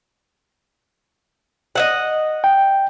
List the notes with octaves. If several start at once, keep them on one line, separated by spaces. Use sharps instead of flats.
D#5 E5 F#5
G5